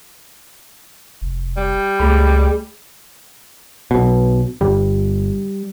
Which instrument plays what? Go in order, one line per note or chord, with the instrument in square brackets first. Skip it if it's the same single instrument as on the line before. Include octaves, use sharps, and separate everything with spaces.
[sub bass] F1
[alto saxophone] G3
[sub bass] C#2 [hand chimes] A3 G#4 B5
[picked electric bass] B1 B2
[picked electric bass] G1 [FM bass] G3